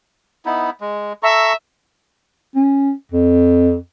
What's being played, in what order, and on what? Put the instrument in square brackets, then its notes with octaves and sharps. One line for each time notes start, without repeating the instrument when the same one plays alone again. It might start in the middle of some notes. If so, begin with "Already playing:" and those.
[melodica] B3 D#4 E4
G#3
[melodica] A4 A#5 C#6 [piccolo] E5
[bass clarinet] C#4
F2